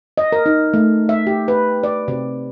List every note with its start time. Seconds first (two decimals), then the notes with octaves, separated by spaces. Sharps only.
0.18 D#5
0.32 A#4
0.46 D#4
0.74 A3
1.09 E5
1.27 G4
1.48 B4
1.83 D5
2.08 C3